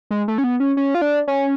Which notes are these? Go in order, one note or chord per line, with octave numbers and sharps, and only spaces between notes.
G#3
A3
C#4
B3
C#4
C#4
F4
D4
C#4